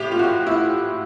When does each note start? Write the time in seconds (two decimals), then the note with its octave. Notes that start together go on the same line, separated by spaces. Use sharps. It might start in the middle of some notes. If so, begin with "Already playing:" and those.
Already playing: A2 G4
0.12 F4
0.19 F#4
0.47 E4